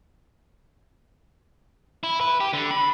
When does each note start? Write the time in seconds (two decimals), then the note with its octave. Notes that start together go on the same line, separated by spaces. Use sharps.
2.03 E4
2.21 B4
2.40 G4
2.53 D3
2.71 B5